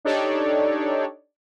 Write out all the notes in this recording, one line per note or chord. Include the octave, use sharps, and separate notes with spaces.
D4 D#4 G4 A4 C#5 D5